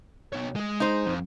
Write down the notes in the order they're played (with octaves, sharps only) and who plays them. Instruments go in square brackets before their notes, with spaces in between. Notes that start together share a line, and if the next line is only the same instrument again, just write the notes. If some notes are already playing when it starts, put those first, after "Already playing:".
[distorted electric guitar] B2 C#5
G#3 G#4
[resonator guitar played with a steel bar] D#4 C5
[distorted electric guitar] F2